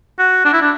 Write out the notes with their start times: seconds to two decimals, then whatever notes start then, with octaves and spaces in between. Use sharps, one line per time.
0.19 F#4
0.45 D4
0.53 E4
0.61 D4